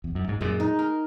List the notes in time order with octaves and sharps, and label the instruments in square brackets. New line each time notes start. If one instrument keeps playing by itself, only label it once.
[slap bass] E2
F#2
G#2
[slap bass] F#2 A#2 [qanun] G#3
[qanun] D#4
A#4